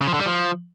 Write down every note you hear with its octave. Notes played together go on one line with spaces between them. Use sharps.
C#3
F3
D3
G3
F3